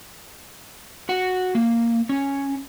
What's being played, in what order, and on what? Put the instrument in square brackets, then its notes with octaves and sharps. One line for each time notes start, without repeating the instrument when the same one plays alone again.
[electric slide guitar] F#4 F#5
A#3
C#4